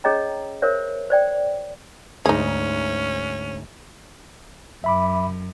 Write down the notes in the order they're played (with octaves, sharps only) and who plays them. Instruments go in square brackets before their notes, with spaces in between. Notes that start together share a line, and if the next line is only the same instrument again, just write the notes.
[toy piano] C#4 G#4 C#5 D#5 G5 A#5
A#4 C5 C#5 E5
C5 D5 G5
[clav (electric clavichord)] D2 G#2 [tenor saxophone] C#4 [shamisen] D#4 G#4
[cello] F#2 [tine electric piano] E5 B5 D6